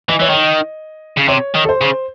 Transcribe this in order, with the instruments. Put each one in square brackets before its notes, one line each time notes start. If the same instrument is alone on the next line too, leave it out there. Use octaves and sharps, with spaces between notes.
[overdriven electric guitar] E3 [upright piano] D#5
[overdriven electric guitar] E3 [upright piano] C#5
[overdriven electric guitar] D#3 [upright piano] D#5
[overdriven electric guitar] C#3
[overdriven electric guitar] C3 [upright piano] C#5
[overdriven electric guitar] D#3
[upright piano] A4
C5
[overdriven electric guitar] C#3